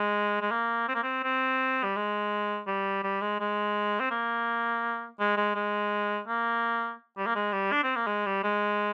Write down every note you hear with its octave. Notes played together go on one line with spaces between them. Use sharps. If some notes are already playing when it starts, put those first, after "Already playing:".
Already playing: G#3
G#3
A#3
C4
A#3
C4
C4
G3
G#3
G3
G3
G#3
G#3
C4
A#3
G#3
G#3
G#3
A#3
G3
A#3
G#3
G3
D4
C4
A#3
G#3
G3
G#3